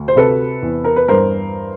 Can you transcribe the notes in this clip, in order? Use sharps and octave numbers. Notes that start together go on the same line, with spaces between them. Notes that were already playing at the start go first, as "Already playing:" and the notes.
Already playing: D2
C5
C3 A4 B4
E2
A#4
B4
G2 A#4 C5